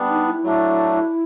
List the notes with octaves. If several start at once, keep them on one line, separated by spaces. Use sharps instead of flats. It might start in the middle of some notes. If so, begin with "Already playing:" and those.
Already playing: G3 B3 D4
D#4
E4
F#3 A3 D4